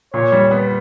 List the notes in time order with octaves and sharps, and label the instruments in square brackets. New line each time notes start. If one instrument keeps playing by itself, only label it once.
[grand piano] A#2 [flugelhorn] C#5
[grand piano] G3
B3